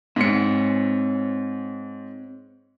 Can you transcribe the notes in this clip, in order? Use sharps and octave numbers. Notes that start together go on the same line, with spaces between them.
G#2 C4 C5 C#5 C#7